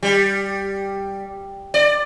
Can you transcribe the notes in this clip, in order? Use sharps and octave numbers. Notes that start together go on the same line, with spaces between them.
G3
D5